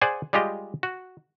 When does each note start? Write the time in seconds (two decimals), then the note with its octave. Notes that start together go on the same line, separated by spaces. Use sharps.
0.01 G#4 C5 D5 F#5 G#5
0.33 G3 G#3 F4 G4 D#5
0.83 F#4